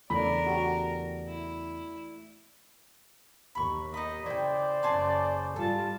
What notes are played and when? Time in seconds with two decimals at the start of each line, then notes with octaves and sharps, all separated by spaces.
0.10 E2 C#3 E3 A3 D4 A#4 D5 B5
0.46 F#4 G4
1.28 E4
3.55 D#2 B5 C#6
3.94 D#4 D#5 B5
4.26 C#3 E4 C5 D5 G5
4.83 F#1 C#3 G#4 A5 C6
5.56 G#2 G3 F4 A4 A5